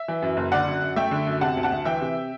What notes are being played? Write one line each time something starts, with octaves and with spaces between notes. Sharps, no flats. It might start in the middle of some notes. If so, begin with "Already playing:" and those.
Already playing: E5
E3
F#2
F#1
D3 D5 F#5
F#2
F#2
A3 E5 G5
D3
F#2
C3 F#5 A5
D2
F#5 A5
D2
E3 E5 G5
C3